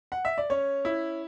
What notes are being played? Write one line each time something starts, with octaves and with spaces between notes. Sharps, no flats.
F#5
E5
D5
C#4 C#5
E4